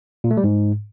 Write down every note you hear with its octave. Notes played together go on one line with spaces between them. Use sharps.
A#2
A3
G3
G#2